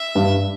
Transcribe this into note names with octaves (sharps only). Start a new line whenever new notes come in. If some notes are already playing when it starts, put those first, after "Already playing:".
Already playing: E5
G2